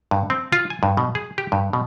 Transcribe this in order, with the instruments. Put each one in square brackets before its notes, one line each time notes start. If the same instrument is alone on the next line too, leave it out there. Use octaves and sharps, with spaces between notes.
[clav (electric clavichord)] G2
C4
F4
G#5
G2
B2
G#4
G4
G2
B2